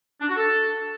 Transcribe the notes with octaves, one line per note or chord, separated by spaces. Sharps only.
D4
F#4
A4